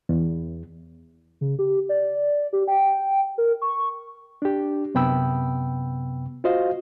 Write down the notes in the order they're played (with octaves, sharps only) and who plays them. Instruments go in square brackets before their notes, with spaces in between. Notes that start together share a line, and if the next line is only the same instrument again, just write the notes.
[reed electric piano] E2
[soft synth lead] C#3
G4
D5
G4
G5
A#4
C#6
[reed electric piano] D4 G4
F#2 C3 B3 G5 B5 E6
F4 F#4 C5 D#5 F5